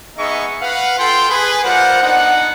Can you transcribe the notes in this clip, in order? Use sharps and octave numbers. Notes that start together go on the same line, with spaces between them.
B3 D#4 G#4 D#5 E5 C#6
B4 F5 F#5
F4 A4 G5 C6
G#4 B4
G3 F4 A#4 C5 F#5
B3 D4 D#4 F#5